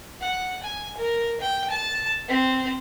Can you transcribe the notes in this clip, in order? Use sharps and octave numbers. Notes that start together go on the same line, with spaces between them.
F#5
G#5
A#4
G5
A5
C4